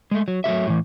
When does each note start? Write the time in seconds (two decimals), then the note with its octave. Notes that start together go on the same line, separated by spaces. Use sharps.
0.11 G#3 A3
0.28 F#3
0.44 F#3 A3 G4 E5
0.67 A2 E3